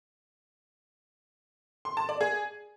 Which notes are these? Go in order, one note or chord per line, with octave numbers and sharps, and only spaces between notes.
C6
A5
D5
G#4